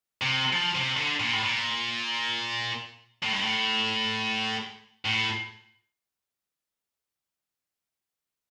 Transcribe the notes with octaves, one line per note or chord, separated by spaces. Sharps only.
C3
F3
C3
D3
A#2
A2
A#2
A2
G2
A2
A2